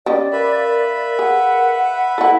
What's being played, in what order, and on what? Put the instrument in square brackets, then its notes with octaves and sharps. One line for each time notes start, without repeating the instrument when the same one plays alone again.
[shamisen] G3 C#4 D#5 [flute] D5
[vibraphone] A#4 F5 [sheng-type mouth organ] B4 E5 B5
[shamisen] G#4 [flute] F#5
[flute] E4 [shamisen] A4 F#5